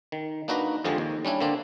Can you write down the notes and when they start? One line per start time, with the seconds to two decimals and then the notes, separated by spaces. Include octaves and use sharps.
0.12 D#3
0.48 A#3 D4 D#4 F#4 B4 D#5
0.84 F2 D3 F3 G#3 G4 D#5
0.98 D#2
1.25 G3 C#4 D4 E4
1.40 D3 A#3 C4 D4